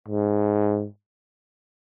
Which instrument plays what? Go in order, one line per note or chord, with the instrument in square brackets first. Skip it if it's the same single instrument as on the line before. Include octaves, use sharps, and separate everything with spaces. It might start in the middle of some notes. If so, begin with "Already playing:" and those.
[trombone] G#2